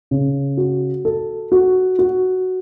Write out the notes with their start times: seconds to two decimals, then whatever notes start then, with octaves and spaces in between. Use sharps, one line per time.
0.11 C#3
0.57 F#4
1.05 A4
1.52 F#4
1.99 F#4